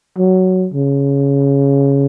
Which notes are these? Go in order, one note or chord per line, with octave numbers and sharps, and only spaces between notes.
F#3
C#3